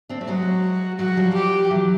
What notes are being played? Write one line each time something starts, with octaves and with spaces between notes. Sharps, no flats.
C4 D4
A3
F#3 G#3 F#4
F#3 G#3 F#4
F3 G3
G4
E3 F#3